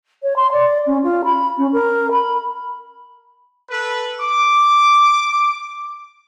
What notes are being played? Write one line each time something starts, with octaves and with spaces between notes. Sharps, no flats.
C#5
C6
D5
C#4
F4
B5
C#4
A#4
B5
A4 B4
D6